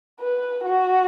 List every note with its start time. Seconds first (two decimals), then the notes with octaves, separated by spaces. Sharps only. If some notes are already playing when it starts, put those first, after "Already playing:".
0.21 B4
0.64 F#4